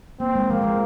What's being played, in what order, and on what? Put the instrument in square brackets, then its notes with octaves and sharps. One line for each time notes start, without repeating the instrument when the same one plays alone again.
[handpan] A#3 [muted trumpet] C4
[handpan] G#3
[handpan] F3 [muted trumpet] A#3
[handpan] G#3